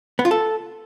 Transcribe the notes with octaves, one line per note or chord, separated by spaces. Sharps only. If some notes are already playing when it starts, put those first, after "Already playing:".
B3
F4
A4